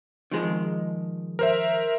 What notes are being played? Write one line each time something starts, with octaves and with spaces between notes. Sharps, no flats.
D#3 F3 G#3
A#4 C5 E5